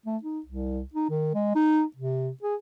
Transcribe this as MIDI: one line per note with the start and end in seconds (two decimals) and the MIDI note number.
0.06 0.17 57
0.23 0.39 63
0.46 0.81 36
0.94 1.09 63
1.10 1.32 51
1.34 1.51 56
1.55 1.82 63
1.96 2.30 48
2.43 2.55 68